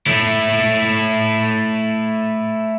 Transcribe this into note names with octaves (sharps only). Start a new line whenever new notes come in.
A3 E4